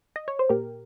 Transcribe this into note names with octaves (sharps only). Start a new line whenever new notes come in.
D#5
C#5
C5
A#2 G4 A#4